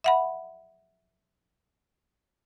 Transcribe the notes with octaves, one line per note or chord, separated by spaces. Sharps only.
E5 F#5 B5